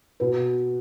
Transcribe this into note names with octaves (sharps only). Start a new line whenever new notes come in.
B2 B4